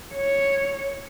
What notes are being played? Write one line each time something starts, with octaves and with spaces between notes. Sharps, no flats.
C#5